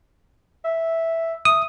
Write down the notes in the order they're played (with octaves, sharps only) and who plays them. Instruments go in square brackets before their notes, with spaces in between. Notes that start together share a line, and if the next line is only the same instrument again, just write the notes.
[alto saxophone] E5
[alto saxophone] E5 [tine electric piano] D#6